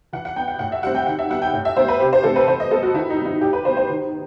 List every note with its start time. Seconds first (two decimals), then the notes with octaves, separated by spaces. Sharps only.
0.13 E3 F#5
0.25 F#5
0.36 B3 G5
0.48 F#5
0.59 A2 F#5
0.72 E5
0.83 G3 C4 F#5
0.95 G5
1.07 D#3 F#5
1.19 E5
1.30 G3 B3 F#5
1.42 G5
1.53 A2
1.65 E5
1.77 G3 B3 C5
1.88 B4
2.01 C3 G4
2.13 C5
2.24 E3 A3 C4 A4
2.36 B4
2.47 E3 C5
2.60 D#5
2.71 G3 B3 A4
2.83 F#4
2.94 D#3 E4
3.10 D#4
3.18 G3 B3
3.26 E4
3.41 A2 G4
3.53 B4
3.65 G3 B3 C5
3.77 C5
3.89 D#3